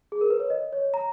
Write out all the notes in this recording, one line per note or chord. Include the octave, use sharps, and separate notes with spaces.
G#4
A#4
B4
C#5
D#5
C#5
A#5